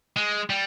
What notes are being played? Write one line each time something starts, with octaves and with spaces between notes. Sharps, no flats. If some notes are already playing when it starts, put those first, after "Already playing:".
G#3
G3